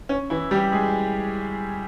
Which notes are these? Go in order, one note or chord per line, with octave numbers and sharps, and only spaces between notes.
C#4
E3 E4
G3 G4
G#3 G#4